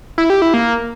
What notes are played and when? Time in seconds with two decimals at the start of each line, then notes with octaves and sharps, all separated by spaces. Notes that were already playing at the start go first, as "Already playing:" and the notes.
0.18 E4
0.30 G4
0.42 E4
0.54 A#3